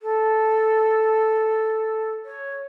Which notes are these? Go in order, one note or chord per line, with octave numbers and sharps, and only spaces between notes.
A4
C#5